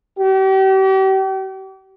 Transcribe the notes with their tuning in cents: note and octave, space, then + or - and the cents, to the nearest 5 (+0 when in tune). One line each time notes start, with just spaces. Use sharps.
G4 -40